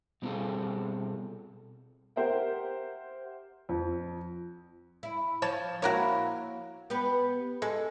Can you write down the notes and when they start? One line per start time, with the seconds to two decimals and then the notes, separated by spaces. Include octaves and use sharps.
0.22 B2 G3 C4 F4 G#4 A4
2.16 G4 A#4 C5 E5 F#5 G5
3.69 F2
5.03 E4
5.42 F3 C#5 A5
5.82 A#3 E4 F#4 A#4 C#5
6.90 B3 G4 B4
7.62 G#3 A4